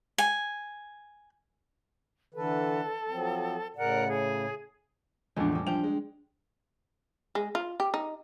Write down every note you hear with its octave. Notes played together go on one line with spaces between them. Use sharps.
G#5
D3 E3 A4 B4
F3 F#3 C4
A2 C#3 A#4 D5 F#5
G#4
E2 A2 F3 G#3 D4
G3 G#3
F3 C5 G5 F7
G#3
G#3
F4
G4
D#4